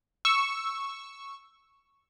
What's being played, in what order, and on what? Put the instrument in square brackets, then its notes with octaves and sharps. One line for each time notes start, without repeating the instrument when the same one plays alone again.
[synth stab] C#6 E6